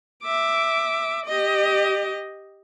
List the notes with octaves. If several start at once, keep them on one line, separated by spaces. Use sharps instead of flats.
E5 D6
G4 D#5